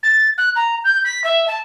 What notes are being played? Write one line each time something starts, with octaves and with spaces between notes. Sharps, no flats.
A6
F#6
A#5
G6
B6
E5
A5